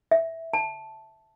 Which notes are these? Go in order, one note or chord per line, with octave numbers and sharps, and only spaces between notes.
E5
A5